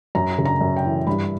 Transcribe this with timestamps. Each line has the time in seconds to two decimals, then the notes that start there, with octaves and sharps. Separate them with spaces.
0.15 F#2 A#5
0.38 C#3
0.45 A#5
0.61 F#2
0.76 G5
0.84 E3
1.07 G2 B5